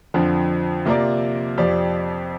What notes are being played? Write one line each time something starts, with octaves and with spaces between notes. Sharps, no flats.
F2 D3 F3 C4
C3 A#3 F4 A#4 D5
F2 F3 C4 G4 D5